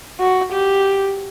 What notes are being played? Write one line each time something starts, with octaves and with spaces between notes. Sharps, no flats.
F#4
G4